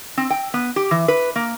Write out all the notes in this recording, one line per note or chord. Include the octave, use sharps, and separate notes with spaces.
C4
G5
B3
G4
E3
B4
A#3